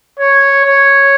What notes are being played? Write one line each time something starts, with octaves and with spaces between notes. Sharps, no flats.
C#5
C#5